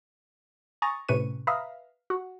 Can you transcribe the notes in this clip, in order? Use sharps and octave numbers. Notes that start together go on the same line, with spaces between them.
G#5 A#5 C#6 D#6 A6
A2 C3 C#4 B4 C#6 D#7
B4 E5 F5 A#5 B5 D#6
F#4